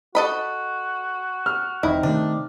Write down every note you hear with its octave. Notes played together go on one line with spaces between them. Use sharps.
F#4 A4 D#5 B5
F6
E1 E3 C4 D#4 E4
C3 D#3 A3 D4